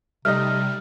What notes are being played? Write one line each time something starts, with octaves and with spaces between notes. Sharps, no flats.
C3 G3 A3 D#4 D#5 F6